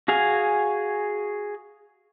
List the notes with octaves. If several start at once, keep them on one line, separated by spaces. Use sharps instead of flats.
F#4 G#4 F5 G#5